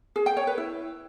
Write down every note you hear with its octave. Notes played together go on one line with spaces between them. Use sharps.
G#4
G5
C#5
B4
E4